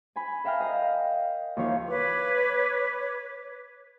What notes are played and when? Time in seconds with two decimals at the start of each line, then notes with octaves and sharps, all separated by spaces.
0.16 G#5 B5
0.44 A#4 E5 F5 G5 A#5 F6
0.60 D#5 F5 A#5
1.57 D#2 E3 F3 C#5 F5
1.87 B4 C#5 D6